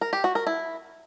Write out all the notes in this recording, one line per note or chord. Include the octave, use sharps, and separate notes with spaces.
A#4
G4
F#4
A#4
E4